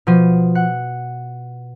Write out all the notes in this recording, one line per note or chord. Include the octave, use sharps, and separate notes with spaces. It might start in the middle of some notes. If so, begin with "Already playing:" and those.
B2 F3 D#7
F#5